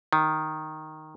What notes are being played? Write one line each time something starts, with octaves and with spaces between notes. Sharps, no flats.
D#3